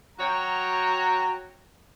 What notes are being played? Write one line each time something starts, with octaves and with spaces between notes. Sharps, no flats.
F#3 F#4 C#5 G5 A#5